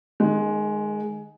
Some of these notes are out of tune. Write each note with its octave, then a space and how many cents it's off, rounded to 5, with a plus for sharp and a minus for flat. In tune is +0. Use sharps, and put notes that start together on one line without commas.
D#3 -20 G#3 +10